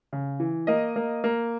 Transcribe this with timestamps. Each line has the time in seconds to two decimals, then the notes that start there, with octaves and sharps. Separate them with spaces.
0.13 C#3
0.40 E3
0.67 A#3 D#5
0.96 A#3
1.24 A#3